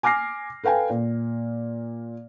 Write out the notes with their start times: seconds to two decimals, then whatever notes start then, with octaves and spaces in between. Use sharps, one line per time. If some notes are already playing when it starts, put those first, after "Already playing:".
0.03 G#5 D6 F6 A#6 C7
0.63 A4 B4 F5 G5 G#5
0.90 A#2